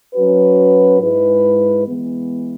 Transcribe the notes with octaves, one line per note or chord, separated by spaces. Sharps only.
F#3 C#4 F#4 B4
G#2 G#3 E4 B4
E3 G#3 B3